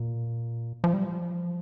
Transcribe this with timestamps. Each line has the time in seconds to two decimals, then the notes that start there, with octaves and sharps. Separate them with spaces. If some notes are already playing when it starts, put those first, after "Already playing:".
Already playing: A#2
0.84 F3
0.94 G3
1.05 F3